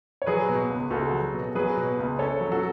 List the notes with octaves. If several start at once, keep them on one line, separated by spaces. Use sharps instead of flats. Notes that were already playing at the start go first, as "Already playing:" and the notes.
C#5
F#3 G#4 B4
B2
C#2
C#2 F#4 A4
F#3
B2
F#3 G#4 B4
B2
C#2
C#4 A4 C#5
F#3
F#4 A4